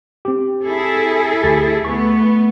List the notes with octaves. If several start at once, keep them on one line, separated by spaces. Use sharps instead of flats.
C4 G4
E4 G#4 A4
D2 G4 A6
A3 B3 C#6